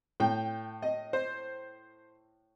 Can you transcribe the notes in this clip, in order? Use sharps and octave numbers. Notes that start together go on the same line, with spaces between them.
A2 G5
D#5
C5